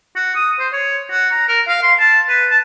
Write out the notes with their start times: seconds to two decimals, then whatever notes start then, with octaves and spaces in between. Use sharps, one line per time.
0.16 F#4
0.35 D#6
0.60 C5
0.73 C#5
1.11 F#4
1.31 A#5
1.48 A#4
1.68 F5
1.83 C6
1.99 A5
2.29 B4
2.50 A5